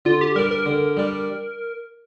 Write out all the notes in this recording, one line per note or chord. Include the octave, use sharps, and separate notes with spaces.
D3 F4
G4
G3 D4 A#4
A#4
D3
G3 D4